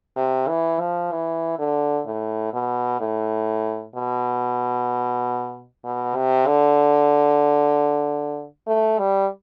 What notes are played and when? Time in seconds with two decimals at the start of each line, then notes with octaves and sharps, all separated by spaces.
0.17 C3
0.48 E3
0.80 F3
1.12 E3
1.59 D3
2.06 A2
2.53 B2
3.00 A2
3.96 B2
5.85 B2
6.15 C3
6.47 D3
8.68 A3
8.99 G3